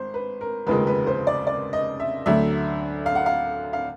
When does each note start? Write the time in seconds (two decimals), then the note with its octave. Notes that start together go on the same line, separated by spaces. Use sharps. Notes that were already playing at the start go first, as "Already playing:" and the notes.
Already playing: G#1 C5
0.14 B4
0.41 A#4
0.67 F1 D#2 C#3 F3 G#3 B4
0.87 B4
1.07 C5
1.27 D5
1.47 D5
1.73 D#5
2.00 E5
2.26 D2 D3 F#3 E5
3.06 F5
3.15 F#5
3.26 F5
3.73 F5